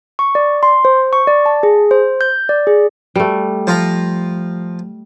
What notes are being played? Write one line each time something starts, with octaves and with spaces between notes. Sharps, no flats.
C#6
D5
C6
C5
C#6
D5
A5
G#4
C5
G6
D5
G#4
G3 A3
F3 F4 A#5